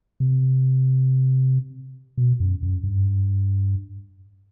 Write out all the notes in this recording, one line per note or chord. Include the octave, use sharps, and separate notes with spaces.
C3
B2
F#2
F#2
G2